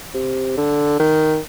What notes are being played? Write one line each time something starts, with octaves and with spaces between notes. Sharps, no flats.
C3
D3
D#3